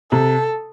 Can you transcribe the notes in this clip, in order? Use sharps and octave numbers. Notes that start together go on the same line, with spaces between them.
C3 A4